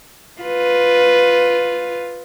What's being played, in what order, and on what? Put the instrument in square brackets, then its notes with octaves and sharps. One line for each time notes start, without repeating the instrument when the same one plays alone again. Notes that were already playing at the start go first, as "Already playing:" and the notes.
[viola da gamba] F4 B4